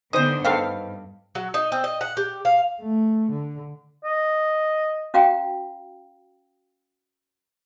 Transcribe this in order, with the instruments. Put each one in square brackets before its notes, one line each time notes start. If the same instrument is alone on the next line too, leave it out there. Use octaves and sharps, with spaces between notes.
[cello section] D3 B3 D4 [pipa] D#4 D#5 [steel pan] C5 D#6
[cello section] G2 [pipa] D#3 B3 C4 [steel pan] A4 F5
[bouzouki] F#3
D#4
C4
D#5
F#5
G4
F5
[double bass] A3
D3
[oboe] D#5
[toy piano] C#4 F#4 F5 G5 A#5